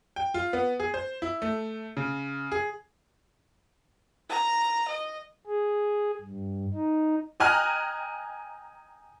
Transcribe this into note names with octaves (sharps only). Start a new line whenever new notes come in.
G5
F4
B3
G#4
C5
E4
A3
C#3
G#4
A#5
D#5
G#4
G2
D#4
D#5 G5 G#5 A#5 F6 F#6